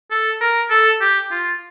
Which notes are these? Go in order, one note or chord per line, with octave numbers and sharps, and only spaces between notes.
A4
A#4
A4
G4
F4